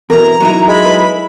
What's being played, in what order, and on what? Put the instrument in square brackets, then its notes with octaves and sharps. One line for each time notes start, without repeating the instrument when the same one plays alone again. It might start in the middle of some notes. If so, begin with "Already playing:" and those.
[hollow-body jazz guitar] E2 B2 E3 [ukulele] A#4 [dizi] A#5
[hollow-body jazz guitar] F#3 D#4 E4
[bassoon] G#3 [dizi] B5
[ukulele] B4